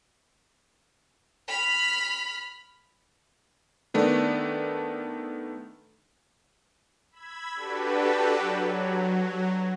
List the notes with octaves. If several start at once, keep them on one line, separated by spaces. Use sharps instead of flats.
B5 F6
D#3 A3 B3 D4
B5 E6 G#6
D4 F#4 G4 A4 B4
F#3